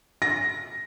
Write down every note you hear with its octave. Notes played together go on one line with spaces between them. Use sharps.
A#6